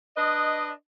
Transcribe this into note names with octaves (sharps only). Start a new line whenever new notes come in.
D4 B4 D#5